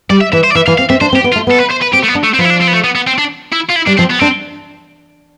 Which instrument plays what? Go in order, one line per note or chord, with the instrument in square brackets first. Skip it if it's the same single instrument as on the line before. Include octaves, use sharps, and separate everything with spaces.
[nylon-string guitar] G3 [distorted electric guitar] D5
[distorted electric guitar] E5
[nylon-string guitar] E3 [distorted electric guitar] E5
[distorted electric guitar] C5
D5
[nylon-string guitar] E3 [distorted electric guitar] E5
[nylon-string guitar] E3 [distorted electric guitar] F5
[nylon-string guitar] C4 [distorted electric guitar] F5
[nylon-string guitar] C4 [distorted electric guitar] E5
[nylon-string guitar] D4 [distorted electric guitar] C5
[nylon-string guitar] C4
[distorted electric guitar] G4
[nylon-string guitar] B3
[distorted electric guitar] F4
[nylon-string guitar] A3
[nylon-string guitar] B3 [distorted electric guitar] A4
[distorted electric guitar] B4
C5
B4
[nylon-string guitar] C4 [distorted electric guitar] G4
[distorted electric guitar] A3
B3
[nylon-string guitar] D4
[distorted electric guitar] A3
C4
[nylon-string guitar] F3 [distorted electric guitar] B3
[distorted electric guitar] E4
D4
C4
B3
A3
B3
B3
C4
D4
E4
F4
E4
[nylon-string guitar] G3 [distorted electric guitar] D4
[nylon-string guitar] F3 [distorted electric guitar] C4
[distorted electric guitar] B3
[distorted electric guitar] C4 [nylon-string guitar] D4